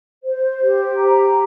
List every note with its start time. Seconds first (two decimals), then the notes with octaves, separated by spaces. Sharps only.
0.24 C5
0.60 G4
0.96 A#5